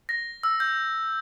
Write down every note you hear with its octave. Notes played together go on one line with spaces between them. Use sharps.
A#6
E6
G6